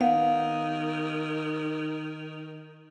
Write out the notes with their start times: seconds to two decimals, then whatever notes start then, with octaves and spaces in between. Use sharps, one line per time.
0.01 D#3 B3 F5